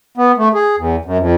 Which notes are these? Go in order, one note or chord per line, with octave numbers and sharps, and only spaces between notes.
B3
A3
G#4
E2
F#2
F2